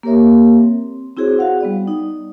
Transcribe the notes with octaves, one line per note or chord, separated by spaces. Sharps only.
A#3 G4 A#4 C#5 E5
C4
C4 E4 F#4 G#4 C5 C#5
F#4 F5 F#5
G3 B3 D5
D#4